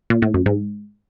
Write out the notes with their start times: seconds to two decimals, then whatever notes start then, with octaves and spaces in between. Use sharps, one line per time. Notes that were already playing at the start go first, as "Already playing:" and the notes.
0.10 A#2
0.22 A2
0.34 F#2
0.46 G#2